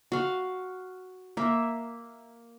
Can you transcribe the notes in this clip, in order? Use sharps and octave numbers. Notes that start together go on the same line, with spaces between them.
F#4 F5
A#3 E5